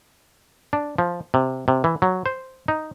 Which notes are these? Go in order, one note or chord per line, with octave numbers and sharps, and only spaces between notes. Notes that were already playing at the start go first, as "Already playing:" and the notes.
D4
F3
C3
C3
E3
F#3
C5
D#4